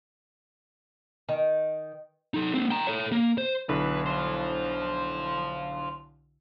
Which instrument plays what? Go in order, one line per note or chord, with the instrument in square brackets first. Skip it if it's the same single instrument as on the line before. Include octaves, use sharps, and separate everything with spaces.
[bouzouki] D#3
[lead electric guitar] D#4 A4
A#3 C4
G5 A#5
A4 C#5
A#3
C5
[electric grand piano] B1 D3 E4 [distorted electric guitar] B4
[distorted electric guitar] C5 F5